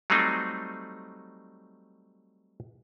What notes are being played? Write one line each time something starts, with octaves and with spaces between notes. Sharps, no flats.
F#3 G3 A3 C4 D#4